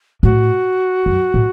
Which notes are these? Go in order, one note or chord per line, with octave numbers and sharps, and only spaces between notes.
A2 F#4
F#2
A2